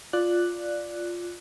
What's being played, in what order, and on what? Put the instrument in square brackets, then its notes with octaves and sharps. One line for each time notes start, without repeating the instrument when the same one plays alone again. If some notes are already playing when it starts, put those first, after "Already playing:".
[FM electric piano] F4 D5 F#6